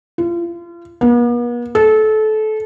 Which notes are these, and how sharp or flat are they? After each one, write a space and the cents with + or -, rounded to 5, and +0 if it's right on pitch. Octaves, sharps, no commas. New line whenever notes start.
F4 -35
B3 -45
A4 -25